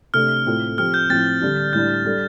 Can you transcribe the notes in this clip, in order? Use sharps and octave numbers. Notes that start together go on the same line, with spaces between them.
C3 A3 D4 A4 F6
A2 A3 C4 F4 A4
F3 C4 G4 F6
G6
A2 F3 C4 A6
D3 G3 D4 G4
A2 G3 D4 G6
G3 D4 A4